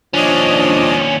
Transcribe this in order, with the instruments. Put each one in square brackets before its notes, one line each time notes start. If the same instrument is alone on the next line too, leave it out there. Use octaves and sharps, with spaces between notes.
[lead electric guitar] D#2 C#4 [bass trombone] F3 [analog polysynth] D4 D5 D#5